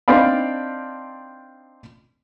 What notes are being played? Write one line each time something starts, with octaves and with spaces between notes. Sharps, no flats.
C4 D4 D#4 D5 F5 B5